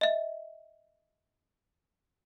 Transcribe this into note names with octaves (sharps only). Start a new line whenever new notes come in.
D#5 E5